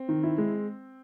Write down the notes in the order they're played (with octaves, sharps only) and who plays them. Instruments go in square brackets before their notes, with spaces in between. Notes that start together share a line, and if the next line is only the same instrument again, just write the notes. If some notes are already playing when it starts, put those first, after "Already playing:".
Already playing: [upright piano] C4
[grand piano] D#3
E4
G#3